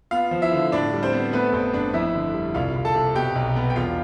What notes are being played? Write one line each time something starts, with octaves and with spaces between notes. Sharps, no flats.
B3 F4 F5
F3
E4 E5
D3
A2 D4 D5
G3
C4 C5
B3
A3 B3 B4
G1 C4 C5
G1 D4 D5
F2 E4 E5
D3
G3
C2 F4 F5
C2
A4 A5
C3
B2 G4 G5
B1
B3
G5
E1 F4 F5